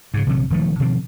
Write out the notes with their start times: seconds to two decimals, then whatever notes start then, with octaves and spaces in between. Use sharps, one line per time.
0.14 G#2 C#3
0.27 A#1 C3 D#3 F#3
0.50 E1 D#3 F3 A3
0.80 B2 D#3 F3 C4